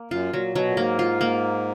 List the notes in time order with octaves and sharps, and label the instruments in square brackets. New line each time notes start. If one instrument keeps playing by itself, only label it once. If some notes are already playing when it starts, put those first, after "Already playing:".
Already playing: [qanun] A#3
[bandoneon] F#2 [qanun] F4
[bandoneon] A#2 [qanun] F#3
[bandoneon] B2 [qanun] F#3
[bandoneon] A#2
[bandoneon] G#2 [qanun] A#3
[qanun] F4
A#3